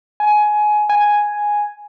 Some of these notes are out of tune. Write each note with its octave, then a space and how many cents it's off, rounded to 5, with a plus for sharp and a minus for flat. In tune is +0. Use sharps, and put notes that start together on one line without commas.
G#5 +20
G#5 +0